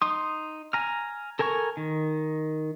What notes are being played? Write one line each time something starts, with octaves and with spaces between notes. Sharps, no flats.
D#4 C6 D#6
G#5 A#5 F6
A4 A#4 G#5 A#5 C#6
D#3